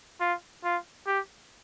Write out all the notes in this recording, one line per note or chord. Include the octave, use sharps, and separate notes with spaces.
F4
F4
G4